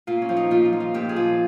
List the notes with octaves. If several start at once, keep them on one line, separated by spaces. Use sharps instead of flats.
A#2 F4
C#4
F3
D#4
A#2 F4
D#4
F3
F4
A#2 G4
G#4
F3